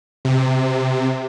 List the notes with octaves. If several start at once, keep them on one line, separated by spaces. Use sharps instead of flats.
C3